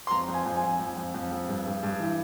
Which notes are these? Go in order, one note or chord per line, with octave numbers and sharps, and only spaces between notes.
C6
F2 A#5
F2
G#5
F2
G#5
F2
F2
F2
F2
F2
G2
G2
G2
E3